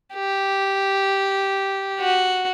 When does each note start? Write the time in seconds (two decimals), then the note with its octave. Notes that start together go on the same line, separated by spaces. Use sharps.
0.14 G4
1.99 F#4